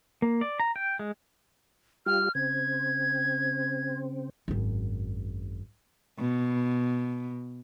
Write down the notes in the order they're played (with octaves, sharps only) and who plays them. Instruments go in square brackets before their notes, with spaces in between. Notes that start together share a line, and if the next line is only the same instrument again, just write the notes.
[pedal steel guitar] A#3
D5
A#5
G5
G#3
[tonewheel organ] G3 F4 G4 [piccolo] F6
[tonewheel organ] C#3 C4 [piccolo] G#6
[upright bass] G#1 F#2
[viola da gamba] B2